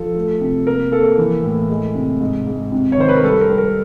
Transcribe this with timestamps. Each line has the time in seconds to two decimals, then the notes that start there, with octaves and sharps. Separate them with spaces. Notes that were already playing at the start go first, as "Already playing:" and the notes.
Already playing: F3 A4
0.15 A3
0.41 C3
0.67 A#3 A#4
0.92 A#3 A4
1.18 E3
1.44 A2
1.69 G#3
1.95 C3
2.20 G#2
2.47 G#2
2.72 C3
2.92 C#5
2.98 D#3 C5
3.09 B4
3.16 A#4
3.24 G3 A4
3.41 A#4
3.50 G3
3.58 A#4